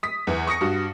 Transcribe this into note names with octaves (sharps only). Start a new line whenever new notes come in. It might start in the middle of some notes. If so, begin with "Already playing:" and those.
D#6 B6
E2 E3
C#6 D#6 A#6 C#7
G2 F#4